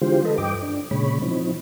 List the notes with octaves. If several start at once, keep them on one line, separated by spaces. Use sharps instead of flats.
D3 E3 G#3 F4 G4 C5
A4 B4 D#5
G2 D#5 G5 D6
D4
A#2 C#3 G#3 C#5 B5
E3 F3 C4 D#4